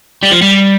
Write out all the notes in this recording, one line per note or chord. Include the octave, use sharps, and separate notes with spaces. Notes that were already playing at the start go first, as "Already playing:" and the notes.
G3
F3
G3